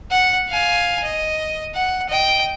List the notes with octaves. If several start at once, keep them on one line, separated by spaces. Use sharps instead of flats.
F#5
F5 G#5
D#5
F#5
D#5 G5